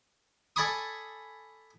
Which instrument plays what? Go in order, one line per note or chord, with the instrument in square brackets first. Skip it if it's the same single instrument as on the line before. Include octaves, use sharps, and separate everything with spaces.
[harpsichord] A4 D5 G#5 B5 C#6 D#6